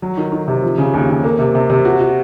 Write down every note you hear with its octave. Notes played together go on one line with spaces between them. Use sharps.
F#3
D#3
D#3
C3
F3
C#3
D#2
D#2
A#3
C3
C3
C3
F#4
F#4